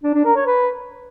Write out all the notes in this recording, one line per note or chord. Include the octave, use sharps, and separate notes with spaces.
D4
D4
A#4
C#5
B4